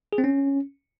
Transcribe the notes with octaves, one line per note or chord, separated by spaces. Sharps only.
G#4
C4
C#4